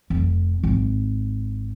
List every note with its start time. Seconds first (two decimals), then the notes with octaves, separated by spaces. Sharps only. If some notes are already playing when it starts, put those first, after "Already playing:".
0.10 F1
0.63 G#1